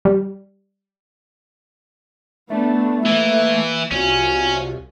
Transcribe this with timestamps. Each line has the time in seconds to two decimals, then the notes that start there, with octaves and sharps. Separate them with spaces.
0.05 G3
2.50 A3 B3 D4
3.06 E3 A#3 E5
3.91 C2 C#4 F4 F#4